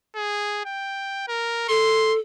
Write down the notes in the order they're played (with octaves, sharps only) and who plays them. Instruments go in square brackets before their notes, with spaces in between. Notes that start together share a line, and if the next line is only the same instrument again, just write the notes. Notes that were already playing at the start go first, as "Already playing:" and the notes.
[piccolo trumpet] G#4
G5
A#4
[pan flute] A4 [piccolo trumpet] C6